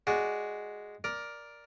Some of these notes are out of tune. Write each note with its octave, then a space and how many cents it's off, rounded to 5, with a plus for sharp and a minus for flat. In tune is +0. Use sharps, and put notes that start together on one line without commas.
G#3 +0 F#4 +0 D5 +0
A#4 +10 D5 +0